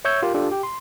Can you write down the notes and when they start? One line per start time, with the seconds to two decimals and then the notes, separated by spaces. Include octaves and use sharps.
0.05 C#5 E5 C#6 E6 G6 G#6
0.22 F4 G4 A#4
0.34 D4 F4 G4 A4
0.51 G4 G5
0.63 C6